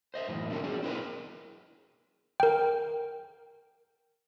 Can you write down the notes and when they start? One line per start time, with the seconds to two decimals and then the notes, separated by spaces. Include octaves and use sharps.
0.14 C5 D#5 E5
0.28 F#2 A2 E3
0.50 D3 F3 C4 G#4 A#4
0.64 F#3 G#4 D5
0.83 C4 E4 A#4 B4
2.40 A#4 G5